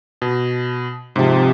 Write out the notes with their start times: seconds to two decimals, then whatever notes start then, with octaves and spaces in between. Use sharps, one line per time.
0.22 B2
1.16 G#2 C3 F3